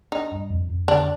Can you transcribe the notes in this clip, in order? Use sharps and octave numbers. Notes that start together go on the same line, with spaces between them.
D4 D#4
G2
F2
F2
D3 D4